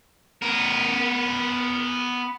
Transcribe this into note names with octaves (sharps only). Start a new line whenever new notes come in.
B3 A#4